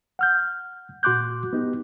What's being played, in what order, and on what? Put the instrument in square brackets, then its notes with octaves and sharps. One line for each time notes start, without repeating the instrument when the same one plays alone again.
[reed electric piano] F#5 F6 G6
A#2 F#4 C6 D6 F#6 G6
B3 D#4 G4